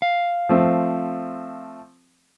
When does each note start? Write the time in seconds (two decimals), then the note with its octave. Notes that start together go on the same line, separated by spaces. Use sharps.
0.02 F5
0.49 F3 A3 C4